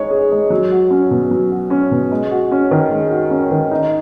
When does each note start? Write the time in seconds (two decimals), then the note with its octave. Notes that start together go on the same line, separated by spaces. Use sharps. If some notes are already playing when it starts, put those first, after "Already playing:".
Already playing: G#3 D#4 C#5
0.10 G#4
0.31 G#3
0.50 F#3
0.71 F#4
0.90 C#4
1.11 B2
1.31 F#3
1.51 F#4
1.70 C#4
1.91 B2
2.12 G#3
2.31 F#4
2.52 C#4
2.71 D#3
2.91 G#3
3.10 F#4
3.31 C#4
3.51 D#3
3.71 D#4